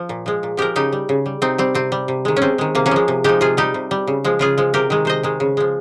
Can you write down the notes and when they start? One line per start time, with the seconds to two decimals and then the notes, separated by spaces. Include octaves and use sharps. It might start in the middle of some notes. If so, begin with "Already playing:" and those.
Already playing: F3
0.09 A#2
0.26 F3 G#3
0.43 A#2
0.57 F3 G#3 G4 A#4
0.76 C#3 D#4 G4
0.92 G3
1.09 C#3
1.26 G3
1.42 C3 C4 D#4
1.58 G3 C4
1.75 C3 C4
1.92 G3
2.08 C3
2.25 D#3 G#3
2.36 C#4
2.42 C3 C4
2.58 D#3 G#3
2.75 C3 A#3
2.86 A#3 C#4
2.91 F3 G#3
3.08 C3
3.24 F3 G#3 D#4 G4
3.41 C3 F4 G#4
3.57 G3 D#4 G4
3.74 C3
3.91 G3
4.07 C#3
4.24 F3 G#3
4.39 C#3 F4 G#4
4.58 F3 G#3
4.74 C3 G4 A#4
4.90 D#3 G#3
5.05 C3 C5 D#5
5.23 D#3 G#3
5.40 C#3
5.57 F3 G#3